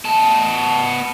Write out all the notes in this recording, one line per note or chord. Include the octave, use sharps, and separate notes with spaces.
B3 A5